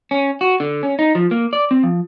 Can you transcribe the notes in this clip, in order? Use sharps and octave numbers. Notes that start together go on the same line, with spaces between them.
C#4
F#4
D3
C#4
D#4
F3
A#3
D5
C4
F3